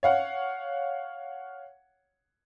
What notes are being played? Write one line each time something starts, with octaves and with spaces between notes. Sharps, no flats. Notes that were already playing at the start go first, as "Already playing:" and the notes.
C#5 F5 F#5